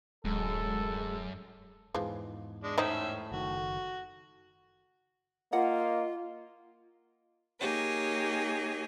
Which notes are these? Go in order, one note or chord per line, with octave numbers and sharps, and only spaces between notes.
D1 F#2 G#3 A4
E2 G#2 E3 F3 G#4
G#3 D4
A2 C#4 D#4 C5 D#5 E5
F#1 D#3 F#4
A#3 F4 A#4 D#5 F#5
A#3 D#4 G4 G#4 C#5